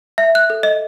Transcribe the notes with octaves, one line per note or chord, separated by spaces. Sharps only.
E5
F#6
A4
D#5